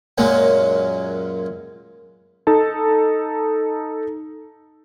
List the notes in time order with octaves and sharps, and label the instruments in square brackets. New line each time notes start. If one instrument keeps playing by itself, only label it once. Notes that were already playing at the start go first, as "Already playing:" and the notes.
[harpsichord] F#2 A#2 F#3 G#3 A#3 C#4
[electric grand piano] D#4 A4 A5